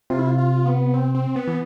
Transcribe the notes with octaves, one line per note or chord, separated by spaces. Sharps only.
C3 F4
E4
F4
F4
B3
C4
C4
B3
E3